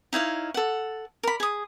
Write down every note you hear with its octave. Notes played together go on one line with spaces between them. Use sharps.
D#4 E4 C#5 F5
A4 F#5
A#4 B5
G#4 D#6